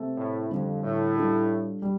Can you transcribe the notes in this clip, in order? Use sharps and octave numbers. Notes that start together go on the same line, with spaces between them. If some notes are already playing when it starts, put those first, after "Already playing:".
Already playing: C3 A3 C4 A4
A2
F2 D3 G3 D4
A2
G3 D4 F4 A4
G3